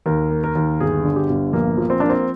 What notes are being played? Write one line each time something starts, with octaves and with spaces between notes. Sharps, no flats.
D#2 A#4
A#3
A#4
D#2
G1 G#4
D3
G4
G1
A#1 A#3
F3
C4
A#3 D4
C4